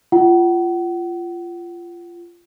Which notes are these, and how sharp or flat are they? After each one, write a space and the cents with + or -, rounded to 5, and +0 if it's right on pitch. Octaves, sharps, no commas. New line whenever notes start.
F4 -20 F#5 +35